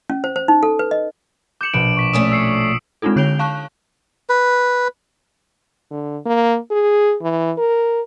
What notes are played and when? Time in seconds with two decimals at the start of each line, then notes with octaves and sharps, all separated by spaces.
0.10 C#4
0.24 C5
0.36 C5
0.48 D#4
0.63 A4
0.79 B4
0.91 D#5
1.61 D6 G6 C#7 E7 F#7
1.73 A#1 B2 D7
1.97 C#6 B6 D7
2.13 A3 C#4 D4 D#6 E7
2.32 E6 C7 C#7
3.02 G#3 C4 D4 D#4 F4 A4
3.16 D3 C#5 G6 D7 F7 G7
3.39 F5 A5 C#6 F#6
4.29 B4
5.91 D3
6.26 A#3
6.71 G#4
7.22 E3
7.57 A#4